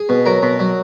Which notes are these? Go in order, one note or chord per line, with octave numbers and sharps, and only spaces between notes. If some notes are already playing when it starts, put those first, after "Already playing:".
Already playing: G#4
B2
F#3 A#4
B2
F#3